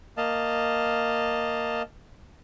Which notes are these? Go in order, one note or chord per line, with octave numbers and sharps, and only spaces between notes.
A#3 D#5 F5 A5